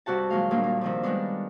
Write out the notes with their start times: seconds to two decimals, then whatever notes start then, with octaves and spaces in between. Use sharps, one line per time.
0.06 G2 C3 F#4 F#5 A5
0.30 A#2 D#3 F#3 G#3 F5
0.51 D#2 A#2 G3 A#3 D4
0.64 A#3
0.81 C3 D#3 F3
1.03 D#3 G3 G#3 B3 D4